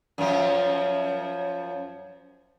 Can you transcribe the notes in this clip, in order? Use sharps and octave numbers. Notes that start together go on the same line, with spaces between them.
F#2 F3